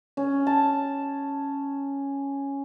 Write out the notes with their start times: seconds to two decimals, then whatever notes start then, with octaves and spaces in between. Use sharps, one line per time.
0.17 C#4
0.47 A5